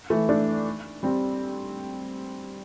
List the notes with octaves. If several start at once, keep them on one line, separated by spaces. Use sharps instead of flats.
E3 A3
A3 D4
G3 C4